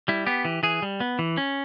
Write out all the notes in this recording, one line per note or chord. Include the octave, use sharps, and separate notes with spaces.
G3 E4
B3 G4
E3
E3 G#4
G3
B3
E3
C#4